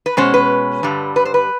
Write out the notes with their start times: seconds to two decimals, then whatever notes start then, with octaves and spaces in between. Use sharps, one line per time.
0.06 B4
0.17 B2 G#3 C#4 C5
0.34 B4
0.83 G2 D3 G3
1.16 B4
1.25 C5
1.34 B4